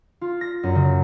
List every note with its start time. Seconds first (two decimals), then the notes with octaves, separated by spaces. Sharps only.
0.21 F4
0.41 A#6
0.63 F#2
0.75 C#3